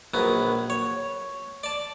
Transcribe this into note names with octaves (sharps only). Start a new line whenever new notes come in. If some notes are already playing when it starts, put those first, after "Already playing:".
A#1 F#3 B3
C#5
D5 A5